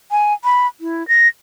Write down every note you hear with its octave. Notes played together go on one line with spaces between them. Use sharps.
G#5
B5
E4
A#6